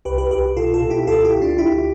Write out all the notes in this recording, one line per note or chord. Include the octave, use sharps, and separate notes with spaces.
C2 G4 B4
G4 B4
C2 G4 B4
B2 F4 A4
F4 A4
B2
E4 G4
D2 F4 A4
E4 G4
D2
D4 F4
D2 E4 G4